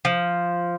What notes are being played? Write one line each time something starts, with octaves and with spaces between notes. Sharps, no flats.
F3